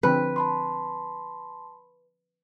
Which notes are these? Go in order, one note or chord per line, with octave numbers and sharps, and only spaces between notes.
D3 F3 C4 B4
A5 B5 C6